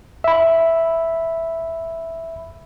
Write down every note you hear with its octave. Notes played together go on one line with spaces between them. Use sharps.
E5 B5